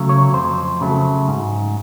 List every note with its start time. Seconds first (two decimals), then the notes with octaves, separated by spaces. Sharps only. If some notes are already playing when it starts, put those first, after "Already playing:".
Already playing: C#3 F#3 A3
0.09 C#5
0.33 F2 C5
0.81 C#3 F#3 A3
1.28 G#2